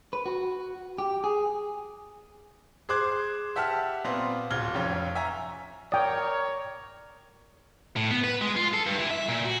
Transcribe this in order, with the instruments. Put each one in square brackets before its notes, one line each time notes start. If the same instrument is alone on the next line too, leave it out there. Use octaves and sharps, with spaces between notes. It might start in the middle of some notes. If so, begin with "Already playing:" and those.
[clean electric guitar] B4
F#4
G4
G#4
[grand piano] G#4 C5 D6 F#6 G#6
G4 E5 F#5 A5 E6 F6
A#2 B3 C4 F4
D1 F4 F6 G#6 G7
F1 F2 C#4 F4
E5 G#5 A#5 C#6
[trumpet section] A#4 C#5 [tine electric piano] D5 [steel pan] G5 D#6
[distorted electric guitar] A2
B3
B4
G#3
F4
A4
G2
E3
E5
A#2
F#4